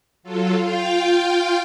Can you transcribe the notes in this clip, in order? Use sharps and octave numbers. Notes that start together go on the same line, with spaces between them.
F#3 F4 A4
F4 F5 G5